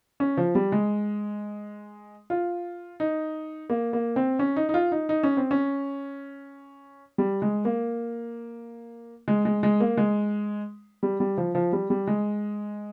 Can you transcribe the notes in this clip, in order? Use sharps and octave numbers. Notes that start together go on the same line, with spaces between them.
C#4
F3
G3
G#3
F4
D#4
A#3
A#3
C4
C#4
D#4
D#4
F4
D#4
D#4
C#4
C4
C#4
G3
G#3
A#3
G#3
G#3
G#3
A#3
G#3
G3
G3
F3
F3
G3
G3
G#3